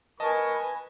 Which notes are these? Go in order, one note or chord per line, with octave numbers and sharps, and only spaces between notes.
A#4 B4 D#5 G#5 A5 C#6